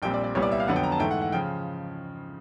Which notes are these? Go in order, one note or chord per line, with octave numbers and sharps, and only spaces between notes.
A#1 A#2 G3 C4 G5
D5
D5
C2 A#2 G3 B3 C#5
D5
E5
F5
F2 D3 F#3 B3 F#5
G5
A#5
A5
G#2 E3 A3 G5
F#5
F#5
C#3 F3 G5